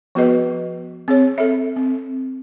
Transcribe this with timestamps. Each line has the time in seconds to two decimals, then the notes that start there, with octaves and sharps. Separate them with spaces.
0.15 F3 B3 F#4 G#4 B4 D#5
1.08 C4 G#4 C#5
1.38 A4 E5
1.76 C4